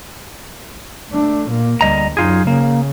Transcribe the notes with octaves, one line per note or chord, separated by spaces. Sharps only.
A3 D4
A#2 A#3
D2 G3 D#5 A#5
F#2 D#4 F4 G#4
C#3 A#3